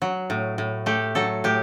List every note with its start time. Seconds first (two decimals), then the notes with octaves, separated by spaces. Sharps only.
0.02 F#3
0.30 A2
0.58 A2
0.86 A3 G4
1.15 F#3 A4
1.44 A2 G4